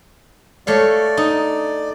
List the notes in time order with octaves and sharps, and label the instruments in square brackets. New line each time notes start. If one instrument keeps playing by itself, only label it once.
[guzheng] A3 C#5 F5 [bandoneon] D5
[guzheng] D#4